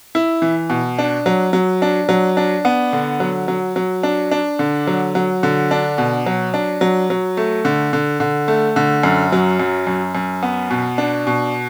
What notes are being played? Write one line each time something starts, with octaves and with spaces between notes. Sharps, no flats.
E4
E3
B2
D4
F#3
F#3
D4
F#3
D4
B3
D3
F#3
F#3
F#3
D4
D4
D3
F#3
F#3
D3
D4
B2
F#3
D4
F#3
F#3
A3
D3
D3
D3
A3
D3
F#2
F#3
F#2
F#2
F#2
B3
B2
D4
B2